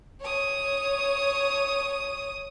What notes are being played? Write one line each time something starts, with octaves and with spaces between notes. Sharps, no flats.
C#5 D#6